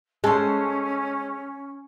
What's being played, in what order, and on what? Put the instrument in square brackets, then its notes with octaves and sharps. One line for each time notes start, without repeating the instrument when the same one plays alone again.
[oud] G#3 [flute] C#4 [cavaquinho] A4 C5